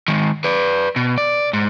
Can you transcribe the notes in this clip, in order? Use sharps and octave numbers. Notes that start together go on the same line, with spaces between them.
D#3 G#3
B4 D5
B2
D5
G#2